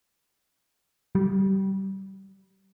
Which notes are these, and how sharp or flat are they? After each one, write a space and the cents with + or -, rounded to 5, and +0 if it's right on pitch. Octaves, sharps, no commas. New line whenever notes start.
G3 -25